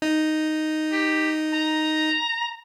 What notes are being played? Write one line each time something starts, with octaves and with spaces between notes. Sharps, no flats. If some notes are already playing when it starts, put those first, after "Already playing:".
D#4
G4
A#5